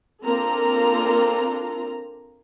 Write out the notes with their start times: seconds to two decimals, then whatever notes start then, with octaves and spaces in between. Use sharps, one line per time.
0.23 A#3 C4 D4 F4 A4 A#5